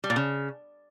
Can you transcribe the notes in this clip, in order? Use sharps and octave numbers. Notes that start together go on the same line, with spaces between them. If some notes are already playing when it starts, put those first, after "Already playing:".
G3
A#2
C#3